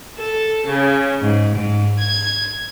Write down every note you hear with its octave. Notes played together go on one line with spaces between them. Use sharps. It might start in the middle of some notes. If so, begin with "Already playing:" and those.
A4
C#3
G#2
G#2
G#6